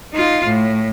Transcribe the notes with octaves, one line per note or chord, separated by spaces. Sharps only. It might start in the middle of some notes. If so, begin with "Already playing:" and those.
D#4 F4
A2